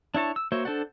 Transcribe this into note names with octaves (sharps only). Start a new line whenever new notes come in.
D4 E4 C#5 A5
E6
A#3 F#4 C5 C#5 E5
D4 A4 C5 D5 F#5